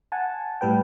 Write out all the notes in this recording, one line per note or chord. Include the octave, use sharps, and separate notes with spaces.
F#5 G#5 A5
A2 G3 B4 G5